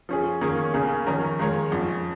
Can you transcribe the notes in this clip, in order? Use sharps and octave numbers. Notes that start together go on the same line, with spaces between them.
F3 C#4 G#4
D#3 A#3 C#4 G#4 C#5
C#2 C#3 A#3 C#4 G#4
F2 D#3 C#4 A#4
D#3 G#3 F4 A#4 C#5
F2 F3 C#4